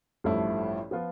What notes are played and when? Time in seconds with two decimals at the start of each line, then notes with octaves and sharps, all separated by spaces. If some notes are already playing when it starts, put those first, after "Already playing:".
0.24 A1 G2 F3 A3 E4
0.91 F3 B3 F4